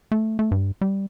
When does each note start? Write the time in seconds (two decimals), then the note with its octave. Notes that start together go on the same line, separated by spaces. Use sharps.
0.12 A3
0.39 A3
0.51 G2
0.81 G3